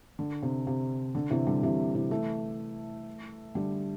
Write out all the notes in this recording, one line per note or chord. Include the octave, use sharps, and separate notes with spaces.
D3
C3
C3
D3
C3 E3
D3 G3
C3 E3
C3 E3
E3 A3
D3 G3